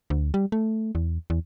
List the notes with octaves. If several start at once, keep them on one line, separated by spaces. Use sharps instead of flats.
D2
G3
A3
E2
E2